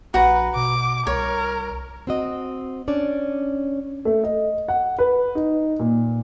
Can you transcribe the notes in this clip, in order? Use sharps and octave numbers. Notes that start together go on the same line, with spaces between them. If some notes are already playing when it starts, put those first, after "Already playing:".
A#1 F#4 B4 A#5
B2 D6
C2 A#4 C#5
C4 F#4 D#5
C#4 D4 D5
A3
D#5
F#5
B4
D#4
A#2